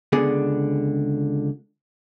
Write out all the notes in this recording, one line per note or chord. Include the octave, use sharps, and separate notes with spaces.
C#2 D3 B3 G#4 D5